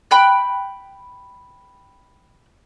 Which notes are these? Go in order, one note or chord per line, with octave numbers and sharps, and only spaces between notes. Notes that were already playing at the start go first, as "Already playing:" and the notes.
G5 B5 F#6